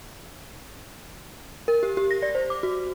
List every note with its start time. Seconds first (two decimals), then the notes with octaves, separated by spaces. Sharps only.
1.68 A#4
1.83 G4
1.97 G4
2.11 A#6
2.22 D5
2.35 C5
2.50 D6
2.63 F#4